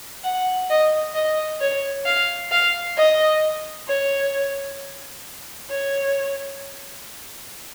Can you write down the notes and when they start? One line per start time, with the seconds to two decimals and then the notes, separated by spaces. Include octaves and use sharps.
0.24 F#5
0.70 D#5
1.15 D#5
1.61 C#5
2.05 F5
2.51 F5
2.97 D#5
3.88 C#5
5.70 C#5